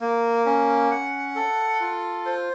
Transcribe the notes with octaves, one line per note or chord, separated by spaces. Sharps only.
A#3
C#4
F#5
A4
F4
C5